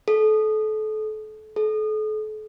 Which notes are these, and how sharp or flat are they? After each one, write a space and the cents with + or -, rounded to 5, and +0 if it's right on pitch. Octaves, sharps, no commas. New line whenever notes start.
A4 -30
A4 -40